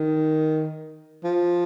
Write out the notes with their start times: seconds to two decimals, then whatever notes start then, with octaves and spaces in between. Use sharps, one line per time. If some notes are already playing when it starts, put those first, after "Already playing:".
Already playing: D#3
1.24 F3